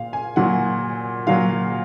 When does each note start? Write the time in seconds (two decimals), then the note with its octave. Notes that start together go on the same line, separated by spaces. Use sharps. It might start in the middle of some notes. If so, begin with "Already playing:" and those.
Already playing: A#2 F5
0.13 G#5
0.36 A#2 F#3 F#5
1.27 A#2 F#3 F5